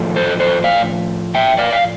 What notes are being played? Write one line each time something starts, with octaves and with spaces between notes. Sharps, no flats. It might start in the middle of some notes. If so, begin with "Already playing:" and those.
Already playing: A2 F3 A3
A4 C5
A4 C5
D5 F5
E5 G5
D5 F5
F5